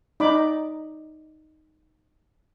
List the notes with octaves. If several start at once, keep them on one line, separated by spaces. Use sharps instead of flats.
D#4 D5 B5 D6